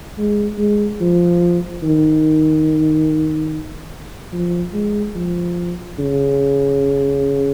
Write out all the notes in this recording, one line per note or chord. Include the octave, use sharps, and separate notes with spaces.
G#3
G#3
F3
D#3
F3
G#3
F3
C#3